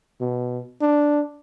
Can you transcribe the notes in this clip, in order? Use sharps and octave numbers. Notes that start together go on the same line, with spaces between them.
B2
D4